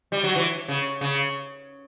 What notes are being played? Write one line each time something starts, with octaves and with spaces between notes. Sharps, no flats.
G3
F#3
E3
C#3
C#3